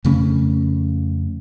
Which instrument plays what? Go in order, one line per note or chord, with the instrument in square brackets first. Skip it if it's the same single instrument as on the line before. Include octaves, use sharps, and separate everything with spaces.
[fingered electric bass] F2 C#3 A3 C#4